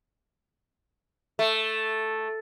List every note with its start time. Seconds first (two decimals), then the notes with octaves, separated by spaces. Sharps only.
1.39 A3